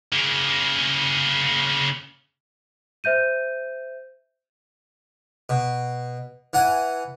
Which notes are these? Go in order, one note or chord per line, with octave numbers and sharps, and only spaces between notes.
C#3 A#3
C5 E5 G6 D#7
B2
E3 F#5 G#5